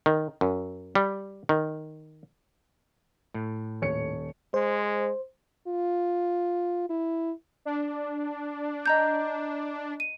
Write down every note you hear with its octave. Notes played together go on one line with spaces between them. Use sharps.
D#3
F#2
G3
D#3
A2
D#1 C#5 C#7
G#3 C5
F4
E4
D4
D#5 A#5 G6
D#7